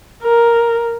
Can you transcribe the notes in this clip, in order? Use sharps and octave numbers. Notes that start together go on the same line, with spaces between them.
A#4